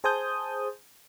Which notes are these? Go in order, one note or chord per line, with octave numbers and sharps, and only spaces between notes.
G#4 C5 G#5 A5 D#6 G6